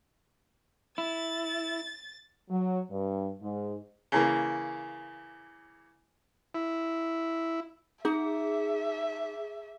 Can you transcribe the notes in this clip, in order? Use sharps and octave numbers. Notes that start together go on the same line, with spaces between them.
E4 A6
F#3
G2
G#2
C#3 E3 A#3
E4
D#4 G#4 E5